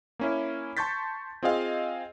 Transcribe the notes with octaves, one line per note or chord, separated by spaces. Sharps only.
A#3 C#4 E4
A5 C6 C#6 G6 A6 B6
C4 F4 G#4 D#5 F5